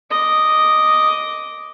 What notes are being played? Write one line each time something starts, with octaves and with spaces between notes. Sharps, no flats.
D#5 D6